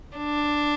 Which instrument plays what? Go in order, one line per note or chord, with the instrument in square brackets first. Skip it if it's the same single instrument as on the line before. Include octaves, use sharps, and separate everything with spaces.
[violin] D4